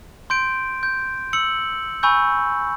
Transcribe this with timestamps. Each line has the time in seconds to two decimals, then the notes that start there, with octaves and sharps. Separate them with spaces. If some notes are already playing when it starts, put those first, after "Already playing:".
0.30 C6 G6 D7
0.83 G6
1.33 E6 C#7 F#7
2.03 G#5 B5 C#6 E6 G6